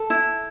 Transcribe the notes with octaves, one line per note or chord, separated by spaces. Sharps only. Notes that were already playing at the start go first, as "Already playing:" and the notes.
Already playing: A4
E4